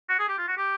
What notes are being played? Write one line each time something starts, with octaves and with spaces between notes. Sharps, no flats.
F#4
G#4
G4
F4
F#4
G4